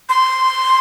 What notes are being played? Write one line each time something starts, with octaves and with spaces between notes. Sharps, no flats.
C6